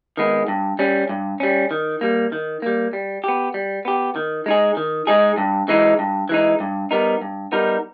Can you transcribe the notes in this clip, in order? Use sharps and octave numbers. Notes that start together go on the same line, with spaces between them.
D#3 G#3 B3
G2
G3 C#4
G2
G3 C#4
D#3
G3 A#3
D#3
G3 A#3
G3
B3 G4
G3
B3 G4
D#3
G#3 D#4 G#4
D#3
G#3 D#4 G#4
G2
E3 G#3 D#4
G2
E3 G#3 D#4
G2
G3 B3 D#4 A#4
G2
G3 B3 D#4 A#4